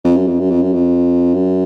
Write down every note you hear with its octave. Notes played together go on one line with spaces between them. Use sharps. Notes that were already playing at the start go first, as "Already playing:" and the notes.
F2
F#2
F2
F#2
F2
F#2
F2
F#2